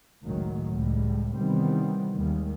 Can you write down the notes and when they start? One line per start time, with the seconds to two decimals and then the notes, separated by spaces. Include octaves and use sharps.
0.24 F#1 C#2 F#2 A2 D#3 F#3
0.72 C#2 A2 G3
1.36 C3 D#3 E3 G3 B3 C4
2.15 D#2 D#3 G3 G#3